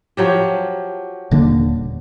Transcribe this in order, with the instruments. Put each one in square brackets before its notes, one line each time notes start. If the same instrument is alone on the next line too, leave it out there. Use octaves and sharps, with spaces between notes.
[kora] F3 F#3 G4
[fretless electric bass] D#1 D3 A#3